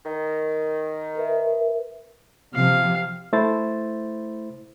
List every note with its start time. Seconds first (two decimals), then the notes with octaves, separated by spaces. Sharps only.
0.04 D#3
1.15 A#4 B4 E5
2.54 C3 F3 F5
3.33 A3 E4 C5 A6